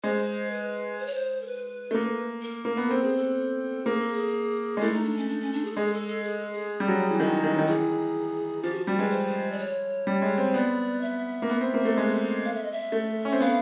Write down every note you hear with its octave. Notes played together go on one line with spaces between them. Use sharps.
G#3 C5
B4
C5
C#5
C5
A#4
B4
A3
A#3
A#4
A#3
B3
C4 A4
G#4
A4
A#3 G#4
A4
G#4
G#3
A3 E4
D#4
D4
C#4
D4
C#4
D4
G#4
A4
G#3 G#4
A4
A4
G#4
A4
G#4
G3
F#3
E3
D#3
D#3
D#3
E3 G#4
F3 G4
F#4
G3 F#4
G#3 B4
C5
D5
C#5
G3
G#3
C4
B3 D5
E5
A#3
B3
C4
A#3
A3
G#3
F5
E5
D#5
E5
A3
C#4
C4
B3 F5